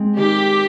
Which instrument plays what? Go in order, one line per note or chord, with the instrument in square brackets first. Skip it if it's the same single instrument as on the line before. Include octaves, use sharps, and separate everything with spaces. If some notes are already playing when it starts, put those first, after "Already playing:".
Already playing: [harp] G#3 C4
[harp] D#3 [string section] G4